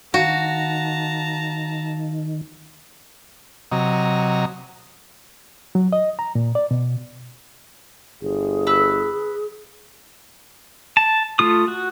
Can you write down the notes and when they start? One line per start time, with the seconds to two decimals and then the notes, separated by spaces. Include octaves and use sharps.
0.14 D#3 F#4 F5 A5 A#5
3.72 C3 F#3 D#5 A#5
5.75 F#3
5.93 D#5
6.19 A#5
6.35 A#2
6.55 D5
6.71 B2
8.22 G1 G#4
8.67 B4 E6
10.97 A5
11.39 A3 F4 D#6
11.68 F#4